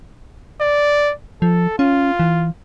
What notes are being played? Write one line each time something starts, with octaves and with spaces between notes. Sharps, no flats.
D5
F3 A4
C#4 F4
E3